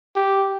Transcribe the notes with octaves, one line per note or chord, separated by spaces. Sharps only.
G4